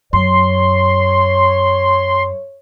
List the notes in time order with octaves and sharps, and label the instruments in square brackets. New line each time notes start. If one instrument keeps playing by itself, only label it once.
[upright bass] F#2 [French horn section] C#5 [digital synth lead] C6